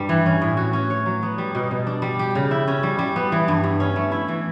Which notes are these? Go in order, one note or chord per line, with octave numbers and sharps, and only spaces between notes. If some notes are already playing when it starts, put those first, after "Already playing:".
Already playing: G2 G3
E3
C#4
A2
F#4
C#4
C#5
F#3
B3
G3
B2
B2
D4
G3
G4
C#3
E4
C#4
G3
G3
B3
E3
G2
G2
C#4
A3
E4
E3